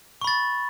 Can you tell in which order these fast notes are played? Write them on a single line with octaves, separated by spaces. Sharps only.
C#6 B5 A6